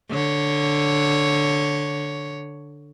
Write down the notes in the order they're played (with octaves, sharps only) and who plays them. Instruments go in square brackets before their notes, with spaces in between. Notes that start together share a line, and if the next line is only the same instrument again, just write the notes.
[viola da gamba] D3 C#5